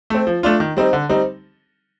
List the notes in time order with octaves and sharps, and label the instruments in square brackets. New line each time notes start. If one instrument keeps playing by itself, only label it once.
[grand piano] A3 C4
F3
A3 D4 F4
D#3
G3 C4 D#4
D3
G3 C4 D#4